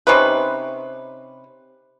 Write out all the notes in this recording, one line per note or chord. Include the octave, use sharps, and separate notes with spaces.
C3 C#4 D#4 B4